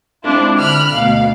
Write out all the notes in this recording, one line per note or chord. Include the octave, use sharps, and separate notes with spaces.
G#3 C4 D4 E4 F4
D3 B5 F6 F#6
D2 B2 F5